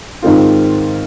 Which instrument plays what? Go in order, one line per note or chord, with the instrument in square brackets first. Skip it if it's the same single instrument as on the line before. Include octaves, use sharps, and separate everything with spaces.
[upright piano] G#2 D#3 G#3 C4 F4